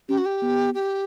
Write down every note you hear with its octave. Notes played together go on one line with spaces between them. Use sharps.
C#4 G4
F#4
G4
B3
G4